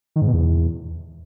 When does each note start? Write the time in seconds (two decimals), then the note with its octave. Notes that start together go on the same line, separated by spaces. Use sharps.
0.16 D#3
0.22 G#2
0.28 B2
0.34 E2